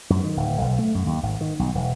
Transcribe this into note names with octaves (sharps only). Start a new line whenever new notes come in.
F#2
D#3
D1
B1
A3
F#2
D#2
G#1
D#3
B1
E1